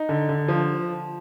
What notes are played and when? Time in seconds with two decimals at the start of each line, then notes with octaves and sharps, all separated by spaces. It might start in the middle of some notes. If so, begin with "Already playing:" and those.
Already playing: D#4
0.09 D3
0.29 D3
0.48 F3